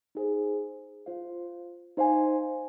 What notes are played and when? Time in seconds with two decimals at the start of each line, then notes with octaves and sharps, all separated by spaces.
0.15 D#4 G#4 C5
1.06 F4 C5 F5
1.97 D#4 C5 F5 G#5